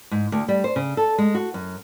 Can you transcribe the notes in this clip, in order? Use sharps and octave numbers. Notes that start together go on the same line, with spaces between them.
G#2
D2
G3
C5
C#3
A4
G#3
F#4
F#2